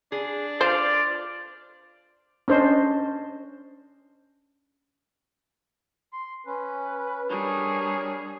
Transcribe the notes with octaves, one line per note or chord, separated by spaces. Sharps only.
D4 G#4
F4 C5 D5 F5
C#4 D4 C5 D#5
C6
C#4 B4
G3 D4 G#4 A#4 C#5